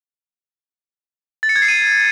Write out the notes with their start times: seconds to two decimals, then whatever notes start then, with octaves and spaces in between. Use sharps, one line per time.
1.43 A6
1.49 C#7
1.56 G#6
1.62 C7
1.68 D#7